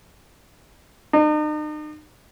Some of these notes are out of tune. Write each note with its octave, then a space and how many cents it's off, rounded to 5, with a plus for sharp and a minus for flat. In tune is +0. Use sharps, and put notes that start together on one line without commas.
D#4 -40